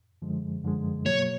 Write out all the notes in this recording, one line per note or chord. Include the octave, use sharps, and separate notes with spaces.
F#2 D3 F3 G#3
F#2 D3 F3 G#3
B2 F#3 A#3 C#5